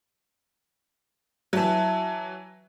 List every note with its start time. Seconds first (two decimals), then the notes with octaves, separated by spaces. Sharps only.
1.53 E3 F#3 E5 G#5 A5